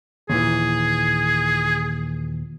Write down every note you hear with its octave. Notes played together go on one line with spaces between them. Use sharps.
D#2 A#2 E3 G#4